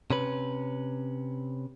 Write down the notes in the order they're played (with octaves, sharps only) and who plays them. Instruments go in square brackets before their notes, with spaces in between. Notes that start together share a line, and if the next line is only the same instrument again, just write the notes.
[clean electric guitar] C3 C#4 B4